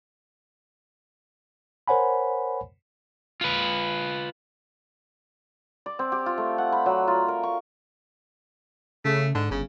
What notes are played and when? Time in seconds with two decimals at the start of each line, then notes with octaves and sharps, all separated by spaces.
1.88 A#4 C5 C#5 F#5 G#5 B5
3.41 F4 B4
5.86 D5
5.99 C4
6.12 G4
6.26 F4
6.38 A3
6.58 F#5
6.72 B5
6.86 F#3
7.08 F4
7.28 A#4
7.43 C#6
9.05 C#3 A3
9.35 G#2 D3
9.51 G1 C#3